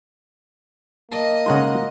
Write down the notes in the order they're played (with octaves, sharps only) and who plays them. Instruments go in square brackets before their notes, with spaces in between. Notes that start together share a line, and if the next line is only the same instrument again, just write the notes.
[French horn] A#3 [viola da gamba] D#5 [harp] A5
[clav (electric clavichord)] C#3 G#3 D#4 [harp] F#5 A#5 C6